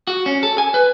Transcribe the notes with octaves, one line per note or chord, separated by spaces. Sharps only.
F#4
C#4
A4
G#5
B4